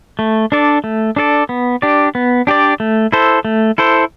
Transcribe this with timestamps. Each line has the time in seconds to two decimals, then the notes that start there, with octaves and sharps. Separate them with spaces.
0.19 A3
0.52 D4 A4 D5
0.84 A3
1.16 D4 A4 D5
1.49 B3
1.82 D4 G4 D5
2.15 B3
2.47 D4 G4 D5
2.80 A3
3.12 E4 A4 C5
3.45 A3
3.78 E4 A4 C5